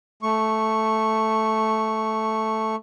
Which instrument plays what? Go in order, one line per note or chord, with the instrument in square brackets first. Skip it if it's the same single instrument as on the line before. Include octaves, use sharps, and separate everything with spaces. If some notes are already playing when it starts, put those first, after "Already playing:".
[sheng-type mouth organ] A3 C#6